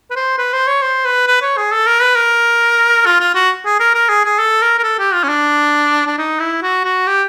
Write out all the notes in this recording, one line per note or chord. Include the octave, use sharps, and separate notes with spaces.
B4
C5
B4
C5
C#5
C5
B4
B4
C#5
G#4
A4
A#4
B4
A#4
F4
F4
F#4
G#4
A#4
A#4
G#4
G#4
A4
A#4
A#4
A4
G4
F4
C#4
D4
D4
D#4
E4
F#4
F#4
G4